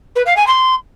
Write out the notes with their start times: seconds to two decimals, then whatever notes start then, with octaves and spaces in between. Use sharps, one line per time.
0.15 B4
0.26 F5
0.36 G#5
0.47 C6